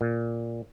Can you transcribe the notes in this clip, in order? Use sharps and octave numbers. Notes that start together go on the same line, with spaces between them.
A#2